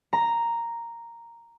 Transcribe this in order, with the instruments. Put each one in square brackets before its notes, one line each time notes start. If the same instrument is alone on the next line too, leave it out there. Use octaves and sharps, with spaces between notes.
[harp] A#5